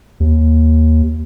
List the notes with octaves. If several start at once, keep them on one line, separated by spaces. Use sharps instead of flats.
D#2